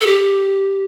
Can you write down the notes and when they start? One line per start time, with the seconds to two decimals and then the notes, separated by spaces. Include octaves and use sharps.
0.01 A4
0.06 G4